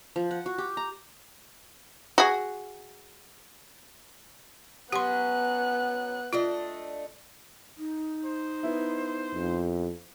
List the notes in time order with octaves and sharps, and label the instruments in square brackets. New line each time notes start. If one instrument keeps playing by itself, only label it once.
[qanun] F3
F#5
F#4
G4
A#5
[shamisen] F#4 G#4
[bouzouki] F#3 C#4 [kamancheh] B3 F#6 [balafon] G4 C6
[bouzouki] A3 D4 D#5 [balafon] F4
[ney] D#4
[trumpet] C5
[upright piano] B3 E4
[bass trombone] F2